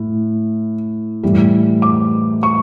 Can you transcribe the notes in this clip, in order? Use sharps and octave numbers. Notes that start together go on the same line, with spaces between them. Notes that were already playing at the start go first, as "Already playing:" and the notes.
Already playing: A2
A2 E3 G3
D6
C#6